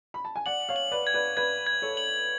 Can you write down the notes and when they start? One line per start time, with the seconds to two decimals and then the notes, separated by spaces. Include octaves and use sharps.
0.14 B5
0.25 A5
0.36 G#5
0.46 D5 F#5 F#7
0.69 C#5 F5
0.76 F#7
0.92 B4 D5
1.07 G#6
1.14 B4 D5
1.37 B4 D5 G#6
1.67 G#6
1.82 A4 C#5
1.97 F#7